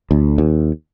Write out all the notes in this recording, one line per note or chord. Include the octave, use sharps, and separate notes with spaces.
D2
D#2